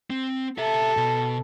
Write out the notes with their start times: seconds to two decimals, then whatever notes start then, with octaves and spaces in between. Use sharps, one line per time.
0.10 C4
0.58 G4 A4 E5
0.97 B2